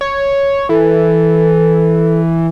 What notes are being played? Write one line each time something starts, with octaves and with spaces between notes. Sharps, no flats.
C#5
E3 A4